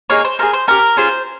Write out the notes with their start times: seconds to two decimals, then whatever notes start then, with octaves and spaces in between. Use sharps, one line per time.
0.10 A#3 D#4 G#4 C#5
0.25 C5
0.39 C4 F4 G#4 A#4
0.53 C5
0.68 C#4 G4 A#4
0.97 C#4 F4 G#4 C5